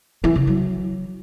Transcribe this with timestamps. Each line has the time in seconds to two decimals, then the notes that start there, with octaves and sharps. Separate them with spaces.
0.24 E3
0.35 C#3
0.47 F#3